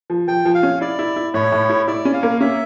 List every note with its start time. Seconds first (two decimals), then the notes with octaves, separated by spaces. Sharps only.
0.10 F3
0.28 F3 G5
0.45 F3
0.55 F5
0.63 C#4
0.81 E4 D5
0.99 E4
1.16 E4
1.34 A2 C#5
1.52 A2
1.69 E4
1.88 E4 D5
2.05 C#4
2.14 F5
2.23 A#3
2.41 C#4 E5